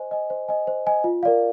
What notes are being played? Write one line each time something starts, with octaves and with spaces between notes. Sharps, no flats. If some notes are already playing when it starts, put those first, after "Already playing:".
Already playing: C5 D#5 G#5
D#5 G#5
C5
D#5 G#5
C5
D#5 G#5
F4
A#4 D5 F5